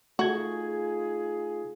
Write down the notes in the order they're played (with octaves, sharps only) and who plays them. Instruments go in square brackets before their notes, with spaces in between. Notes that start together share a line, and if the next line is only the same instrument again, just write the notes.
[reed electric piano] A3 G#6 [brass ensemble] D#4 F4 G#4 [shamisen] F#4